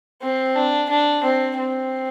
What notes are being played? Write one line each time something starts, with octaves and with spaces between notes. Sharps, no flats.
C4
D4
D4
C4
C4